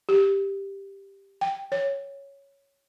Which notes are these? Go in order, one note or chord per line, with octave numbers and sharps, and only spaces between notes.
G4
G5
C#5